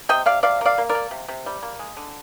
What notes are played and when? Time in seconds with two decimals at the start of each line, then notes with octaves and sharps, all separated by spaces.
0.09 C3 D#5 G5
0.26 C3 D5 F5
0.43 C3 D5 F5
0.61 A#3 D5 F5
0.78 A#3
0.89 A#4 D5
0.95 A#3
1.11 C3
1.28 C3
1.46 G3
1.63 A#3
1.79 G#3
1.97 D3